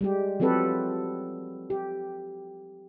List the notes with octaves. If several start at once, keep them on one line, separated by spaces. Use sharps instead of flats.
G3 G#3 G4
F3 F#3 C4 G4 A4 B4
G4